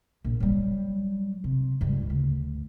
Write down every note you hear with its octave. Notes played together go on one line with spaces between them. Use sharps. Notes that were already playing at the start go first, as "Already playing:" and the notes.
A#1
F#3 G3
C3
C#2 G2
D2